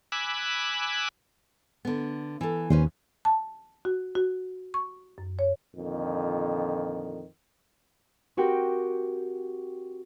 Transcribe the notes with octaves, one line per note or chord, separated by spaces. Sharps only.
G#5 B5 D6 E6 F#6
D3 B3
E3 A4
D#2 C#4 B4 C5
A5
F#4
F#4
C#6
F#2
C#5
F2 A#2 D3 D#3
C4 F#4 G4 A#4 G5